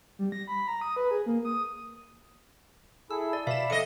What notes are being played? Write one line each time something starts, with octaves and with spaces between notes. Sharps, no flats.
G3
A#6
B5
A#5
D#6
B4
G#4
A#3
D#6
E4 G#4 A4 E6
D5
B2 D5 E5 F5 B5 E7
F2 A4 D#5 C#7